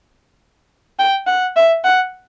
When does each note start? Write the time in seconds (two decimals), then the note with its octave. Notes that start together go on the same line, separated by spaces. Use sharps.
0.99 G5
1.27 F#5
1.56 E5
1.84 F#5